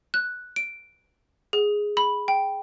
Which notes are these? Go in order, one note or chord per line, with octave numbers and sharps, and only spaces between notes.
F#6
D7
G#4
B5
G5